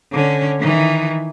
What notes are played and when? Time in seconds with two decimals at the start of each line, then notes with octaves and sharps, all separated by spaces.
0.13 D3 C#4
0.59 D#3 E3